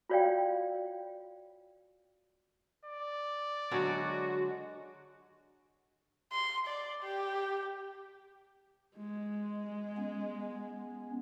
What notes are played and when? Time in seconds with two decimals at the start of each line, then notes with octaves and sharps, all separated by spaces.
0.09 F4 F#4 C#5 D5 F5 G5
2.85 D5
3.71 D3 F#3 G#3 F#4
6.32 C6
6.67 D5
7.03 G4
8.97 G#3
9.97 B3 C#4